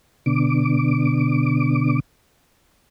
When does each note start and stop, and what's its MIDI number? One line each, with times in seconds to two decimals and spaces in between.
0.26 2.00 47
0.26 2.00 50
0.26 2.00 86